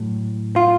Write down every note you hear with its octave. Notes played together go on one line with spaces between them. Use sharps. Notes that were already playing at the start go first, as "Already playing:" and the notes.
Already playing: A2 F#3
F4